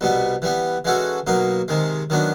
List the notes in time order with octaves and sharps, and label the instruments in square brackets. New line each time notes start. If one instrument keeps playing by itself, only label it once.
[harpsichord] C2 B2 G3 B3
E3 G3 B3
E3 G#3 C#4 F#4 A4
B2 F#3 A#3 D#4
C3 D#3 G#3
D#3 F#3 B3 D4